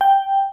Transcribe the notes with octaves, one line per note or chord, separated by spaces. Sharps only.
G5